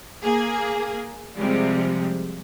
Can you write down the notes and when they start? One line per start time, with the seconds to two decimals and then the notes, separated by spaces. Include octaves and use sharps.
0.23 A#3 G#4
1.35 C3 F3 G3 G#3